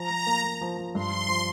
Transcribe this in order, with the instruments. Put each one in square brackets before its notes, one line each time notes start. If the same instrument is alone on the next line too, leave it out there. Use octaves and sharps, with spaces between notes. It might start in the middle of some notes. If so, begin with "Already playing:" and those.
Already playing: [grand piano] F3 [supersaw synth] A#5
[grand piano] F3
A#3
A#3
F3
F3
[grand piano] G2 [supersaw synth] C6
[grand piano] F3
F3